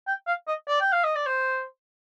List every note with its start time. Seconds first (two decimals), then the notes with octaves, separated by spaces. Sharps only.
0.07 G5
0.27 F5
0.47 D#5
0.68 D5
0.81 G5
0.92 F5
1.04 D#5
1.15 D5
1.26 C5